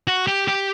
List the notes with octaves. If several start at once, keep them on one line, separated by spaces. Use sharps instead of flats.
F#4
G4
G4